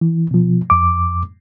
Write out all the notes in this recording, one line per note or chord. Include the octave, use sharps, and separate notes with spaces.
E3
B2 F3
F2 D6